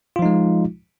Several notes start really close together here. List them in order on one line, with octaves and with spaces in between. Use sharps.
F4 F3 D#4 G#3